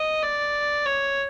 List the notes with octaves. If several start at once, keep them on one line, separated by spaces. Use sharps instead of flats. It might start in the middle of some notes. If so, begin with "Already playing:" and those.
Already playing: D#5
D5
C#5